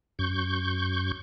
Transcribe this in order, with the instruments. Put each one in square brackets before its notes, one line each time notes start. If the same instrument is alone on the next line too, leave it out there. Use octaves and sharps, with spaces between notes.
[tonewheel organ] F#2 C#6 G6